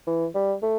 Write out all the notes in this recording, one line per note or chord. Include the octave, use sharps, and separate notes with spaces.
E3
G3
A3